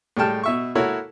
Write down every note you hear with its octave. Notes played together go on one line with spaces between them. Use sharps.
A2 G3 G#3 G5 A5 F6
B2 E5 C#6
A#3 E4 F#4 A4 A#4 C#5